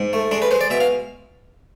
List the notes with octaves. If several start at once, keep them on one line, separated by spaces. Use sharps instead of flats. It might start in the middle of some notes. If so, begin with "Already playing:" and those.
Already playing: G#2
A3
G#3 D4
B4
G#3 C5
D5
B2 E5
F5